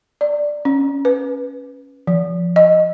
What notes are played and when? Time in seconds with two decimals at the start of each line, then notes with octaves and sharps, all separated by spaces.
0.21 D5
0.65 C#4
1.05 B4
2.07 F3
2.56 D#5